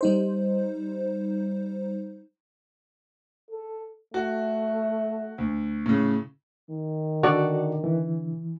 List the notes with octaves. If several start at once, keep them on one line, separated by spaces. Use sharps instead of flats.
G3 D#4 C5
A4
A3 F#4
D2
A2 C#3
D#3
D3 F#4 A4 D5
E3